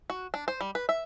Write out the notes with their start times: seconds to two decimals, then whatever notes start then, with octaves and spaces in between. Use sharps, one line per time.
0.10 F#4
0.34 D4
0.48 C5
0.61 G3
0.75 B4
0.89 E5